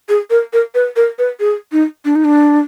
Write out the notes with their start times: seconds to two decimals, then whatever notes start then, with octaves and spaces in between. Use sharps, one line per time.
0.09 G#4
0.30 A#4
0.53 A#4
0.75 B4
0.96 A#4
1.19 B4
1.40 G#4
1.72 D#4
2.05 D4
2.16 D#4
2.25 D4